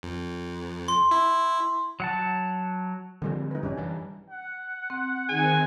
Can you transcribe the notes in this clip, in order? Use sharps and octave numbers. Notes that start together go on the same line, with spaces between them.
F2
C6
E4
F#3 F#5 A5
D3 F3 G3 G#3 C4
D#4 B4
A1 F#2 G3 C#4 D4
G2 E3
F#5
C4
D#3 C4 G#4 G#5